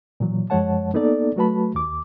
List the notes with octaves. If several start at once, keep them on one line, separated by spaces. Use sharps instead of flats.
A#2 E3 F#3
F#2 F3 G#3 C#5 F#5 A5
A#3 B3 D#4 A4 D5
F#3 A3 F#4 B4 A5 B5
D#2 D6